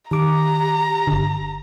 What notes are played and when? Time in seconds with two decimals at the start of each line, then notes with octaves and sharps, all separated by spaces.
0.11 D#3 G4 A#5 D6
1.07 G1 D3